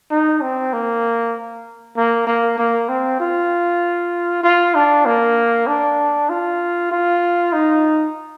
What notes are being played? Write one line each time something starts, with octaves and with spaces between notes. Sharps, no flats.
D#4
C4
A#3
A#3
A#3
A#3
C4
F4
F4
D4
A#3
D4
F4
F4
D#4